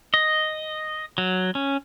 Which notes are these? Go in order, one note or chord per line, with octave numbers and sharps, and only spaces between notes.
D#5
F#3
C#4